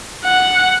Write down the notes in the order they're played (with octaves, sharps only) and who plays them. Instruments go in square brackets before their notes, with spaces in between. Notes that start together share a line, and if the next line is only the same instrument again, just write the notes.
[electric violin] F#5